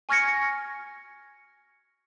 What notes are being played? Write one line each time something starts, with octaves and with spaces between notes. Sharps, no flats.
G#5 C#6 F6 G#6 A#6 C#7